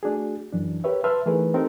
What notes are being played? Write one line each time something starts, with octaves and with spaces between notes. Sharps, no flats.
A3 D4 F#4 G#4
F#2 E3 D4
G4 A#4 B4 C#5 E5
B4 E5 A5 C6 E6 F6
E3 A3 D#4 G#4 A#4 B4
C4 D#4 G4 A4 A#4